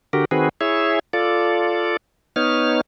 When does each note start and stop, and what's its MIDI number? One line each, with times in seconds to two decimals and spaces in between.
0.13 0.25 50
0.13 0.25 66
0.13 0.25 67
0.13 0.25 70
0.31 0.49 51
0.31 0.49 60
0.31 0.49 66
0.31 0.49 68
0.31 0.49 71
0.61 0.99 64
0.61 0.99 68
0.61 0.99 73
0.61 0.99 76
1.13 1.97 65
1.13 1.97 69
1.13 1.97 74
2.36 2.81 59
2.36 2.81 63
2.36 2.81 73
2.36 2.81 89